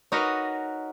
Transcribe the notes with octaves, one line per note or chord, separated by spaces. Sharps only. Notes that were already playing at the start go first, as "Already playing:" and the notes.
D#4 F#4 A#4 B4 C#5 D#5